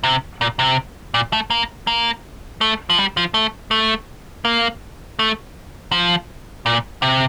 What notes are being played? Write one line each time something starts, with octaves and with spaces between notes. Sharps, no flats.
C3
A#2
C3
A#2
A3
A#3
A#3
A3
F3
G3
F3
A3
A3
A#3
A3
F3
A#2
C3